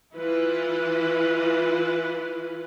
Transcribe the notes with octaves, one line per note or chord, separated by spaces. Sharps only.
E3 E4 F4 B4